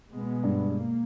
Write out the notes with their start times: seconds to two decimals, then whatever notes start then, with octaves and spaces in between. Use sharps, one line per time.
0.12 B2 G#3 B3
0.44 G2
0.75 A#3